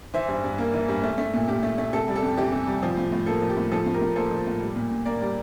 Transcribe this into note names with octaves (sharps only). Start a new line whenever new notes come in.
E3 C5 E5
G2
G2
A#3
E3
G2
A3
A3
A#2
A#2 G4
A3
A3
C3 A4
G3
A4
F2
E3 G4
C3
G3
F3
A2
A2
A#3 A4
F3
G4
A2
F3 A4
A2
G4 A#4
A2
A#3 A4 C5
F3
A2
G3
A#2
A#2
A#3 A#4 D5
G3